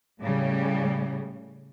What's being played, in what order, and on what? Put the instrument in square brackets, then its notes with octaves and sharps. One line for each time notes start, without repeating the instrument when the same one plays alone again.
[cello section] A2 C#3 G3